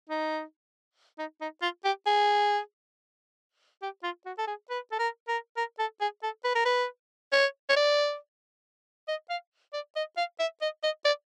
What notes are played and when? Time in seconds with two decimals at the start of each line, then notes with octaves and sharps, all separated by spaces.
0.09 D#4
1.19 D#4
1.41 D#4
1.62 F4
1.85 G4
2.06 G#4
3.82 G4
4.03 F4
4.26 F#4
4.38 A4
4.47 G#4
4.70 B4
4.92 A4
4.99 A#4
5.28 A#4
5.57 A#4
5.79 A4
6.01 G#4
6.23 A4
6.44 B4
6.55 A#4
6.65 B4
7.32 C#5
7.69 C#5
7.76 D5
9.08 D#5
9.30 F5
9.73 D5
9.96 D#5
10.17 F5
10.39 E5
10.62 D#5
10.83 D#5
11.05 D5